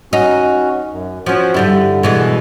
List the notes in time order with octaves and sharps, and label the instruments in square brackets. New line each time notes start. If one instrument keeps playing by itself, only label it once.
[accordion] C#4 F#4 [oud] D#4
[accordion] F#2
[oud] F3 C#4 [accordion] F#4
[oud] G2 G3 E4 [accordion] D3
[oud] B2 E3 G#3